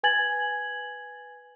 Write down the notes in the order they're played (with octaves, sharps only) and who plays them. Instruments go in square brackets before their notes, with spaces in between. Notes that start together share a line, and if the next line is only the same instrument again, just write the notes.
[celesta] B4 G#5 G#6 A6 F#7